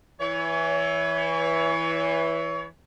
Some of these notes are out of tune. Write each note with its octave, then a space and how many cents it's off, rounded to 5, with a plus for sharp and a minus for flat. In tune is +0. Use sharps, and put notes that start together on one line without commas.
E3 +0 C#5 +30